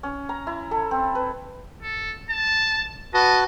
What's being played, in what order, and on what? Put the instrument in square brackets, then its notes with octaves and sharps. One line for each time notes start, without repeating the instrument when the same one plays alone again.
[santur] C#4
A#5
E4
A4
C4
B4
[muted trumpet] A4
A5
[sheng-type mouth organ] F#4 B4 A5 [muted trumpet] D#5